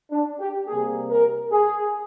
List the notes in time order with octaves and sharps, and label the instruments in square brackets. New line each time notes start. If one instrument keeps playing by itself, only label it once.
[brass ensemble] D4
G4
C3 G3 A#3 G#4
A#4
G#4